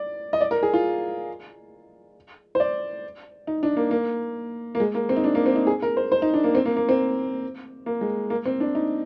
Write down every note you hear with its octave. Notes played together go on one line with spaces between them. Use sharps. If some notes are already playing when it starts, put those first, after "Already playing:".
Already playing: D5
D#5
D5
A#4
G#4
F4
C5
D5
D#4
D4
A#3
A#3
A#3
G#3
A#3
C4
D#4
D4
A#3
C4
D#4
G#4
A#4
C5
C5
D#4
D4
A#3
C4
A#3
A#3
C4
A#3
G#3
A#3
C4
D4
D#4